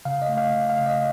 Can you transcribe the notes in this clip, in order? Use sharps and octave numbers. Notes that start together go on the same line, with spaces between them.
C#3 F5
D#5
A3
F5
C#3
F5
C#3
D#5